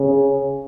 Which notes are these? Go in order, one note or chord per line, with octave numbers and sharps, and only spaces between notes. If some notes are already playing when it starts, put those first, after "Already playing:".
Already playing: C#3